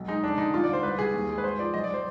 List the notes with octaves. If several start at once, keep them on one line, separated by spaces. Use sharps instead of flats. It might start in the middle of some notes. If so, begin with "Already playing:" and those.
Already playing: B1
G#3 D#4
F1 D4
D3 D#4
G3 F4
D5
D3
C5
C2 B4
G3 G#4
D#2
G#3
B4
G#1 C5
F3 D5
B1 D#5
D5
G3 C5